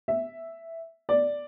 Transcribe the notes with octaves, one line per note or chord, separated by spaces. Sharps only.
E5
D5